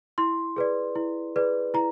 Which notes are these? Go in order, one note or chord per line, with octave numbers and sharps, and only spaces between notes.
E4 C6
G#4 B4 D5
E4
G#4 B4 D5
E4 A#5